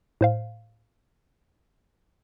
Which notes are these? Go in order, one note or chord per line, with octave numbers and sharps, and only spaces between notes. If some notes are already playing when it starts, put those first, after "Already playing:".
A2 C5 F5